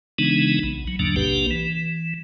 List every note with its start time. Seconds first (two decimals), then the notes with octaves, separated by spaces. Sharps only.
0.18 C#3 E3 G#3 B3 D4 D#4
0.63 B1
0.88 F#3
0.99 E2 G#2 D3 F#3 A#3 D4
1.16 B1 C3 A#3 D4 G4 B4
1.51 E3